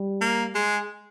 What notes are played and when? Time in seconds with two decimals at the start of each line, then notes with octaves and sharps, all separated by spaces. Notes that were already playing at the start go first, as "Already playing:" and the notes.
Already playing: G3
0.21 A#3
0.55 G#3